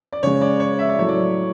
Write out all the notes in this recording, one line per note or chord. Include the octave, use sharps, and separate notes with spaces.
D5
C#3 G#3 C#5
D5
C#5
E5
D5
A2 F#3 A3 C#5
D5